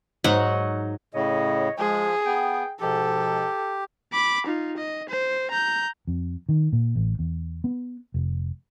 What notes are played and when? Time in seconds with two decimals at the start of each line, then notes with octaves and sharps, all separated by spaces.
0.24 G#2 F#3 D#4 F#5
1.14 A2 C#3 C#5 D#5
1.79 F3 G#3 G#4
2.26 B3 G5
2.81 G#2 B2 F3 G4 A4
4.13 B5 D6
4.46 D#4 F4
4.77 D#5
5.09 C5
5.51 A#5 G6
6.07 F2
6.49 D#3
6.73 A#2
6.96 A1
7.19 E2
7.64 B3
8.14 F1